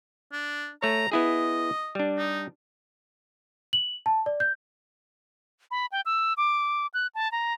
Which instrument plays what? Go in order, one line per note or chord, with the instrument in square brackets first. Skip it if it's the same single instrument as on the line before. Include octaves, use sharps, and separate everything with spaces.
[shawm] D4
[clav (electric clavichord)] A3 C#5 [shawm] A#5
[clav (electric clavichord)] B3 E4 G#4 [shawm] D#5
[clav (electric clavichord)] G3 D4
[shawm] D#4
[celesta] F#7
A5
D5
G6
[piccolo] B5
G5
E6
D6
F#6
A5
A#5